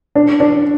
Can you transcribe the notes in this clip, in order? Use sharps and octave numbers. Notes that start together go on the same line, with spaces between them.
D4
D4